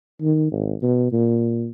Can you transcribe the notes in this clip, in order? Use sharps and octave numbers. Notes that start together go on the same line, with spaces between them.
D#3
G#1
B2
A#2